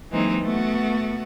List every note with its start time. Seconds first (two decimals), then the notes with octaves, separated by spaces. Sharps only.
0.11 E3 F#3 G#3 A#3 C4 D#4
0.42 A3 B3 F#4